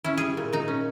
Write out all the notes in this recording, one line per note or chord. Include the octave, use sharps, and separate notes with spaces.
C#4 E4
G3 G#4
A#2
A#2 D#4
C#4